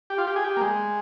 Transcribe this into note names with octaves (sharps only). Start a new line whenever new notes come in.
G4
F4
G4
G#4
G4
A#3
G#3